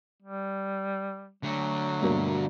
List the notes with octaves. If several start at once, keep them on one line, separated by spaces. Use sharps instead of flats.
G3
D3 F#3 A3
G2 B2 A#3